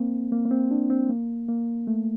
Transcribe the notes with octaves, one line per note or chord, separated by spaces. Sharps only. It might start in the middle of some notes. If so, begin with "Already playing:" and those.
Already playing: A#3 C4
A#3
A#3
C4
D4
C4
A#3
A#3
A3